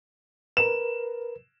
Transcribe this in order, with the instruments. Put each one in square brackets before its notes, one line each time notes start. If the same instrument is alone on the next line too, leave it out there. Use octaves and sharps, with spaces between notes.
[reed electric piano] A#4 B4 [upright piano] E7